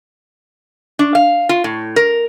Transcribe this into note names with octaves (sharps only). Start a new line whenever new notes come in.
D4
F5
F4
A2
A#4